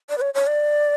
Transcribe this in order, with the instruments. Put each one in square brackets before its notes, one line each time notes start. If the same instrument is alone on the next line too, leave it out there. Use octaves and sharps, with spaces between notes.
[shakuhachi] D5
B4
C#5
C#5
D5